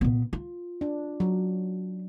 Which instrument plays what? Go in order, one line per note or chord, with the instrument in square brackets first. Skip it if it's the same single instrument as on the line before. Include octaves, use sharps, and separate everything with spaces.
[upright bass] A#2 B3
F4
[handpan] D4
F#3